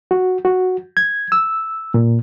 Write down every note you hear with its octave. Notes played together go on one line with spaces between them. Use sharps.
F#4
F#4
G#6
E6
A#2